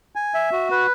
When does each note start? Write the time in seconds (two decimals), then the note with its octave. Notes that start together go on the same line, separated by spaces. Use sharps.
0.15 G#5
0.34 E5
0.52 F#4
0.71 B4